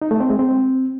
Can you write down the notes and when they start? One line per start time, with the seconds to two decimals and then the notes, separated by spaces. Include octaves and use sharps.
0.02 D#4
0.11 A3
0.20 C4
0.30 G#3
0.39 C4